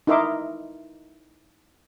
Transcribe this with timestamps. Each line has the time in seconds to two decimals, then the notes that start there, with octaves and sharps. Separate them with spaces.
0.07 D#4 E4 A#4 E5 C6 D6